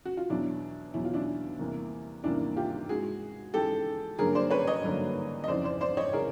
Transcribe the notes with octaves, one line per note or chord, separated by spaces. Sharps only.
F#4
F4
E2 B2 F#3 D4 E4
E2 B2 F#3 E4
F4
D4 E4
E2 C3 E3 G3 A#3
E2 C3 E3 G3 A#3 D4 E4
F4 G4
G#2 E3 G#3 F#4 G#4
G#2 E3 G#3 G4 A4
G2 D3 F#3 A#3 G#4 A#4
C5 D5
B4 C#5
C#5 D#5
G2 D3 F#3 A#3
D#5
F2 C#3 E3 C5 D5
C5 D5
C5 D5
C#5 D#5
C#3 E3 G#4 A#4